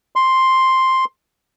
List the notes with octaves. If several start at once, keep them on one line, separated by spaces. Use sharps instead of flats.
C6